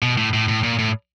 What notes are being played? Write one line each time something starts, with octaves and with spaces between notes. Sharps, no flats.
B2
A2
A2
A2
A#2
A2